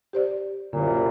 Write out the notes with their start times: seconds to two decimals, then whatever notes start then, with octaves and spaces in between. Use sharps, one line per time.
0.13 G4 C5 D5
0.73 C2 F#2 A#2 D3